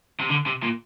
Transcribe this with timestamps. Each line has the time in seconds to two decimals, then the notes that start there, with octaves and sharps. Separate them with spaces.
0.21 C3
0.30 D3
0.47 C3
0.63 A#2